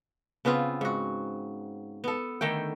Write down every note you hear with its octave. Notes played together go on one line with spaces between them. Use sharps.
C#3 B3 C4 F4
G#2 F#4
B3 A4
D3 D#3 A3 G5